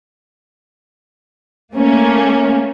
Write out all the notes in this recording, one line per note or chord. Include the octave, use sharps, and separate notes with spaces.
A3 A#3 C#4